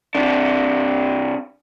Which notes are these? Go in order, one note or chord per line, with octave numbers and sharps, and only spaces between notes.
C3 D4